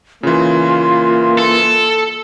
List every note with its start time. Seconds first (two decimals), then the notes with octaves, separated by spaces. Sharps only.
0.23 C#3 E3 A#3 F4
1.38 A4